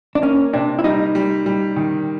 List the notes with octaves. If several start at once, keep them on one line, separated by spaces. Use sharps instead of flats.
D4
A#3 C#4
C3 D4
E4
G3 D#4
G3
G3
D#3